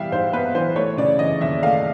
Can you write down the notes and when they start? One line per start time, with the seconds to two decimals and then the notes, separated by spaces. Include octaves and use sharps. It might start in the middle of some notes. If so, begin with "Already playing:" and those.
Already playing: E3 G3 B3 E5 F5 G5
0.12 G#2 C5
0.33 B3 B4
0.55 E3 C5
0.76 A3 C#5
0.97 C#3 D5
1.19 E3 D#5
1.41 D#2 E5
1.63 A3 F5